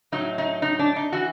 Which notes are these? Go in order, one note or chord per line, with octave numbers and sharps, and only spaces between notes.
A2 F#3 A3 D#4
D#4
D#4
D4
D#4
E3 F#4